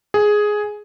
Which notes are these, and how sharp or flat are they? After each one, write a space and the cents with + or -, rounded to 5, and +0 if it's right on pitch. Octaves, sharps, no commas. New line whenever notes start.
G#4 +5